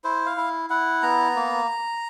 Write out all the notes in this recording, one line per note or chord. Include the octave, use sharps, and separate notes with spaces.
E4 C5
F5
E4
E4 F#5
B3 A#5
A#3